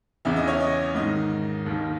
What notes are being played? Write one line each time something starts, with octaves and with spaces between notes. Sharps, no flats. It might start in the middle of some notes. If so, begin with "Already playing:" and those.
E2 C#3 E3 E5
D#5
C#5
D#5
G#2 D#3 D#5
D#2 D#3